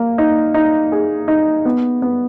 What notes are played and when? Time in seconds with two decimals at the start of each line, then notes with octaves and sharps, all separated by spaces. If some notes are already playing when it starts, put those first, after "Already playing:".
Already playing: A#3
0.18 D#4
0.54 D#4
0.92 G#4
1.28 D#4
1.65 B3
2.02 B3